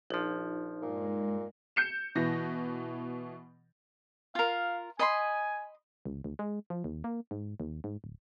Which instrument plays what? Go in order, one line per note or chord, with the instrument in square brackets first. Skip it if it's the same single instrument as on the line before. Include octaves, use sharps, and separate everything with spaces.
[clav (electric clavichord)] A#1 F3 [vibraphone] D#4
[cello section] G2 G#3 [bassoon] A#2
[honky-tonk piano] G6 C#7 E7
B2 E3 A#6
[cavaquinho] F4 A#4 [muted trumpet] F5
[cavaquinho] D#5 B5 C6 [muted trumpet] G#5
[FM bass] C#2
D2
G#3
F3
D#2
A#3
G#2
D#2
G#2
D1